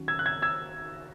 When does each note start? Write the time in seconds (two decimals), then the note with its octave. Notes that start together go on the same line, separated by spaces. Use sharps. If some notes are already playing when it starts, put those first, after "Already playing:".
Already playing: D#3 F#3 C#4
0.08 E6 G#6
0.19 F#6
0.26 E6 G#6
0.42 E6 G#6